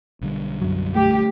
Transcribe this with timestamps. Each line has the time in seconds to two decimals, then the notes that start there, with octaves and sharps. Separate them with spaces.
0.21 B1 D3 G3
0.62 F#2 F#3
0.95 A3 G4